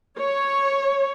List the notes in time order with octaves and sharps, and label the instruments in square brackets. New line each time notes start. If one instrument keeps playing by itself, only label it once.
[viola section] C#5